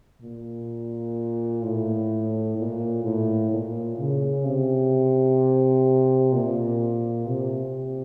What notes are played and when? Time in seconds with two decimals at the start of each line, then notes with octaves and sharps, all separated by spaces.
0.22 A#2
1.62 A2
2.56 A#2
3.04 A2
3.50 A#2
3.97 C#3
4.45 C3
6.33 A#2
7.27 C3